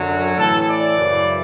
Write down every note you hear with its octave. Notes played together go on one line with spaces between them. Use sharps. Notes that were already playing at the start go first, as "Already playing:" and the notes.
Already playing: F#2 D3 F#3
A2 E3 A4
D5
F#2 C#3 E3